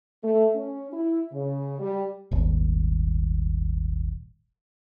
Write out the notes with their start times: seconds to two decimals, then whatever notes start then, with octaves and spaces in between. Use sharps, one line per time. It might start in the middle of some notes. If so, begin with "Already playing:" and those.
0.23 A3
0.54 C#4
0.91 E4
1.31 C#3
1.79 G3
2.31 D#1 G#1